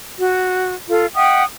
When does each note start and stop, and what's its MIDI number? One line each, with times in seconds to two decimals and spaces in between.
0.18 0.73 66
0.89 1.07 65
0.89 1.07 69
1.15 1.43 76
1.15 1.43 78
1.15 1.43 79
1.15 1.43 87